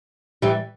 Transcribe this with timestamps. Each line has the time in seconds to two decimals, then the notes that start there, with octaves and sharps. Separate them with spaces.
0.42 E3 G3